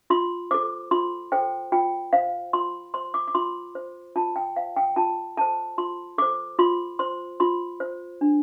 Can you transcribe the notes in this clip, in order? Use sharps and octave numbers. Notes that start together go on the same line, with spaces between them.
F4 C6
A4 C5 D6
F4 C6
A4 C5 G5
F4 G5
C5 F5
F4 C6
C5 C6
D6
D6
F4 C6
C5
F4 A5
G5
C5 F5
G5
F4 A5
A4 C5 A5
F4 C6
A4 C5 D6
F4 C6
C5 C6
F4 C6
C5
D4